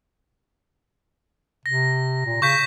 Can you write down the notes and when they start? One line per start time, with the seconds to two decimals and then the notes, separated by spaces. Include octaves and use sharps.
1.66 C3 A#6
2.26 A#2
2.42 C#3 C#6 G6 B6